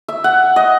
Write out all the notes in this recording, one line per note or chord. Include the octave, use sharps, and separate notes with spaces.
E5
F#5
D#5